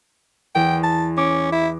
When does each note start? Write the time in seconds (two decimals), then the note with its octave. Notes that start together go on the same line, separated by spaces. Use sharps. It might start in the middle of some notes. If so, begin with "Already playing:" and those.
0.55 E2 G5
0.83 A5
1.17 C#4 D6
1.52 E4